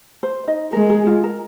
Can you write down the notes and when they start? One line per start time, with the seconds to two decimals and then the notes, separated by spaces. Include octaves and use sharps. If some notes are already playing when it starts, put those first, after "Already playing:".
0.23 C5
0.47 D#4 D#5
0.73 G#3 A#4
0.90 G#4
1.07 F4
1.24 A#4